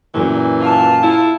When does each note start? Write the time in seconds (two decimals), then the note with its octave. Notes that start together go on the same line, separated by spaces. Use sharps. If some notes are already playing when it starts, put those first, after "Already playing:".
0.14 F#2 A#2 E3
0.60 F4 A5
1.03 E4